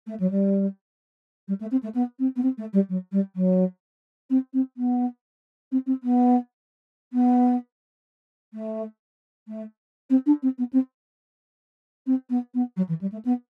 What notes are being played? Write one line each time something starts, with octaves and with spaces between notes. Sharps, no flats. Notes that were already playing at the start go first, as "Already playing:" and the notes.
A3
F#3
G3
G3
A3
C4
A3
B3
C4
B3
C4
A3
G3
F#3
G3
F#3
C4
C4
B3
C4
C4
B3
B3
A3
A3
C4
D4
C4
B3
C4
C4
B3
B3
F#3
E3
G3
A3
B3